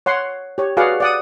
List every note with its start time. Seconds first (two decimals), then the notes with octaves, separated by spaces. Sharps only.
0.06 C#5 F#5 C6
0.58 G4 C#5
0.77 F#4 G#4 B4 D5 F5 F#5
1.00 D5 F#5 D#6